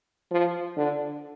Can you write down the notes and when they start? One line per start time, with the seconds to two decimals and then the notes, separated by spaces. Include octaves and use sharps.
0.31 F3
0.77 D3